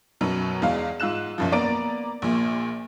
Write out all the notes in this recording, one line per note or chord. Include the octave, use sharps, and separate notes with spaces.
F#2 B2 F#3 B3
E2 G#3 F5
G#2 F4 E6 F#6 E7
B1 F#2 F3
A#3 B3 D5 A#5 A6 D7
A#1 A#2